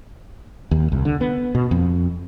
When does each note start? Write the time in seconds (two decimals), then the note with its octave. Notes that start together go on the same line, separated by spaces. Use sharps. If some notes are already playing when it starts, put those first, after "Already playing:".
0.71 D#2
0.92 C2
1.05 D3
1.21 B3
1.55 B2
1.71 F2